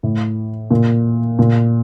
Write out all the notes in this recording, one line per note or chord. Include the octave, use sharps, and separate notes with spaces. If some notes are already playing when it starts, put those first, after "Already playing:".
A2
A#2
A#2